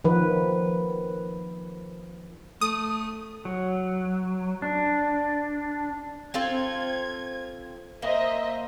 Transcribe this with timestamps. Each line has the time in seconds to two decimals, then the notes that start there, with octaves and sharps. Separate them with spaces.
0.04 D#3 F3 B4
2.61 A3 D#6
3.45 F#3
4.62 D4
6.34 C4 F4 A4 G#6
8.02 A#3 C5 D#5 E5